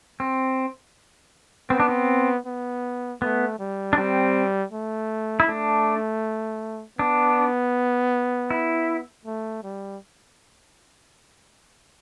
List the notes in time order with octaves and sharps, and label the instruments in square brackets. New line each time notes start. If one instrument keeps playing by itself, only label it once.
[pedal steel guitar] C4
[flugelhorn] B3 [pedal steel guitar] C4
[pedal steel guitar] D4
C4
[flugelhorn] B3
[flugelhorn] A3 [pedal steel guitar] B3
[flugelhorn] G3
[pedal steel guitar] D4
[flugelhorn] G3 [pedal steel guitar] C4
[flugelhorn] A3
[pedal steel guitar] E4
[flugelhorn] A3 [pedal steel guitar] D4
[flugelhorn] B3 [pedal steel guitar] D4
[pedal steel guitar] E4
[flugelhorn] A3
G3